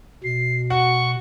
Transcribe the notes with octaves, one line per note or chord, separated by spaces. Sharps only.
B2 C7
F#4 F#5 C#6